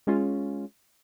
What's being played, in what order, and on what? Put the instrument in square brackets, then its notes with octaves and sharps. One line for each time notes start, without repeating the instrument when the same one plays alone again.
[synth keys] G#3 C#4 F4